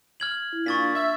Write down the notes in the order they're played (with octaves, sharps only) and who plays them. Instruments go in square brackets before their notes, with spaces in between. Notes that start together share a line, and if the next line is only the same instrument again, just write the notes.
[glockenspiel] F6 G#6 F#7
[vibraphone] E4
[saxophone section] A#2 [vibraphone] D4 [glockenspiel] C#6 A6 B6
[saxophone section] E5